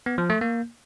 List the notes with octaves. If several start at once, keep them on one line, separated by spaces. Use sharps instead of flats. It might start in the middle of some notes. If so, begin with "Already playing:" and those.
B3
F3
A3
A#3